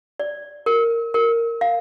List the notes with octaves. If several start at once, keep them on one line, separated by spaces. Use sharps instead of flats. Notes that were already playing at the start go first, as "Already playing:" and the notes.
D5
A#4
A#4
F5